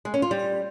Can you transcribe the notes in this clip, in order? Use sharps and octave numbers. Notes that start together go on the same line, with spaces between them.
G#3
C#4
F4
G3